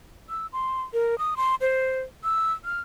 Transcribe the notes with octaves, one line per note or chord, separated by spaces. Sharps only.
E6
C6
A#4
D#6
C6
C5
E6
F6